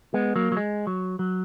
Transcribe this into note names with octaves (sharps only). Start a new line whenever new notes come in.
G#3 B3
F#3 A#3
F#3
G#3
F#3
F#3